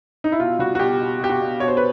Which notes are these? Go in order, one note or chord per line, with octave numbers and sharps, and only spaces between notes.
D#4
E4
B2 F4
G3 F#4
F#4
B2 G4
B2
B2 G4
F#4
B2
B2 C#5
C5
B4